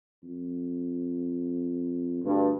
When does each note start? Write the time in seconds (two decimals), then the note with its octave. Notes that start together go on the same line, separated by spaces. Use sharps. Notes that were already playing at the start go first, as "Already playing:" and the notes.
0.23 F2
2.24 D2 G2